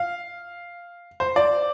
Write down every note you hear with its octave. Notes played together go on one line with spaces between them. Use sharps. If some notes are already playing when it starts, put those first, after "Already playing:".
Already playing: F5
C5
D5